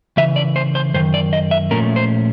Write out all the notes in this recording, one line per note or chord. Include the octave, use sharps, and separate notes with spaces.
C#3 E3 E5
D5
C5
C5
F#2 D#3 C5
D5
D#5
E5
A#2 F3 A3 C#4 A#4
C5